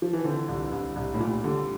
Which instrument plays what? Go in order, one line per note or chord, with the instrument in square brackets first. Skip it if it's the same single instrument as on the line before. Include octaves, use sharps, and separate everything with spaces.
[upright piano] F3
E3
[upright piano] D3 [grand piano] C4
[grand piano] C2
C2
C2
[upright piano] A2
[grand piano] C2 [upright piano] A#2
[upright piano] D3 [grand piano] G3